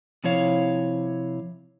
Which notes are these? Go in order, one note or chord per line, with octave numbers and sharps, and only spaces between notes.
C3 F3 E4 C#5 F5